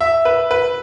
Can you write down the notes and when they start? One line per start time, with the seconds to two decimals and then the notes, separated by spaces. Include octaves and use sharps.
0.01 E5
0.25 B4
0.51 B4